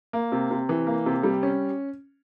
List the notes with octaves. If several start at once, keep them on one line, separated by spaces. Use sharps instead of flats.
A#3
C3
C3
E3
A#3
C3
G3
C#4